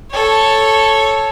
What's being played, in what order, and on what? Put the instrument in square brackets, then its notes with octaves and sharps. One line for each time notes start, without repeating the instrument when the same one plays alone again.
[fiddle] A4 C#5